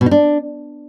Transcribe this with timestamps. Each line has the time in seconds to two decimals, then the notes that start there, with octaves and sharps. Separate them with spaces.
0.01 B2
0.06 D#4
0.11 D4